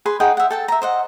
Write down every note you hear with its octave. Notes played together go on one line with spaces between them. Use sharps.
G#4 B4 B5 C6
D#4 G#4 F#5 G5
E5 F#5
A4 G5 A5
E5 A#5
C5 D#5 F#5